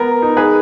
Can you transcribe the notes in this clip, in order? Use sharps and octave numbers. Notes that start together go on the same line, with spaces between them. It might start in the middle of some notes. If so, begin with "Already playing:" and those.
Already playing: B3 A#4
D#4
G#4 B4